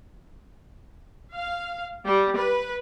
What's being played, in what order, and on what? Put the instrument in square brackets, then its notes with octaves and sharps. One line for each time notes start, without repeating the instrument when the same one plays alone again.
[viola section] F5
G3
B4